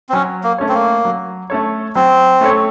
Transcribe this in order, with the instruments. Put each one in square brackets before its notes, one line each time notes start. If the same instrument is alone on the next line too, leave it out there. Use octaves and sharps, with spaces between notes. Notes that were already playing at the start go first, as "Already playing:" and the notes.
[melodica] C4
[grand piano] F#3 [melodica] C#4
[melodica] A#3
[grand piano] A3 C#4 A4 C#5
[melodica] C4
A#3
[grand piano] F#3
A3 C#4 A4 C#5
[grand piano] F#3 [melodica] C4
[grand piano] A3 C#4 A4 C#5